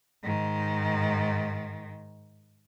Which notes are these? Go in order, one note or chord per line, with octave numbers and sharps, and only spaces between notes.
G#2 D#3